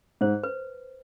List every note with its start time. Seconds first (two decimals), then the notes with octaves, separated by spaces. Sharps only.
0.21 G#2 C5
0.43 B4